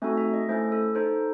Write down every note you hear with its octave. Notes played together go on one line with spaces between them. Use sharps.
A3 C4 D#4 F#4 A4 G#5
E5
D#5
A3 C#4 E4 A4 C5
A4
D#4 A4 C5